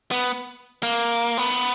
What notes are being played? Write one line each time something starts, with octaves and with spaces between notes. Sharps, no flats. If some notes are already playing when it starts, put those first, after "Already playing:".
B3
A#3
B3